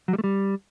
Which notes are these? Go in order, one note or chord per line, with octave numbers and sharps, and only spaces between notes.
F#3
G3
A3
G3